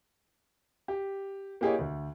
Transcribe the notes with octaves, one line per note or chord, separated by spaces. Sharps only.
G4
A#3 E4 G4 G#4 C#5 D#5
D2